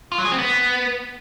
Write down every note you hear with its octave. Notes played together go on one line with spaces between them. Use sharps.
F4
F#3
G#4
C4
B3